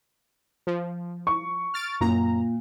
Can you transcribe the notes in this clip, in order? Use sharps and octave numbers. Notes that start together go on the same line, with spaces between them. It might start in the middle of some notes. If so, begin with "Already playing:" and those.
F3
C#6
F6 A6 D7
F#2 A#2 A#5